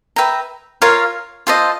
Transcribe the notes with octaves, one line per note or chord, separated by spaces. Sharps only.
B4 E5 G5 A#5
F4 A#4 C#5 F5
F4 A4 C5 D#5